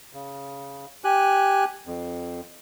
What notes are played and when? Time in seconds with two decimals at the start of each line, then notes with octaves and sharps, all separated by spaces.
0.13 C#3
1.04 G4 G#5 F#6
1.87 F2